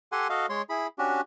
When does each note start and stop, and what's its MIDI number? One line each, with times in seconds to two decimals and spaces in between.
0.12 0.27 67
0.12 0.27 69
0.12 0.27 78
0.12 0.27 80
0.12 0.27 84
0.30 0.46 66
0.30 0.46 69
0.30 0.46 75
0.30 0.46 77
0.49 0.62 56
0.49 0.62 73
0.49 0.62 84
0.69 0.87 64
0.69 0.87 68
0.69 0.87 83
0.99 1.21 61
0.99 1.21 62
0.99 1.21 66
0.99 1.21 67